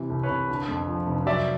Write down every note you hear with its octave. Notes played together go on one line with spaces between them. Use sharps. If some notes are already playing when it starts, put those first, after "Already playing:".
Already playing: C3 E3
C2
B4 C#5
C2
D3
F2
F3
F1
F#3 D5 E5